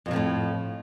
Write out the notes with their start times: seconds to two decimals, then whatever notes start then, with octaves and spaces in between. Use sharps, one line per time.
0.06 F2
0.08 F#3
0.11 C3
0.13 F3
0.16 A2